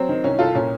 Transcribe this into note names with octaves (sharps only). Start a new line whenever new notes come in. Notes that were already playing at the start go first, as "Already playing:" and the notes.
Already playing: F#3 C4
D#3
C2 C#4
C2 F4 A4
A#2 C#4